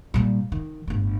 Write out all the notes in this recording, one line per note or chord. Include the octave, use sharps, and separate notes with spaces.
A#2 G3
D#3
G1 A2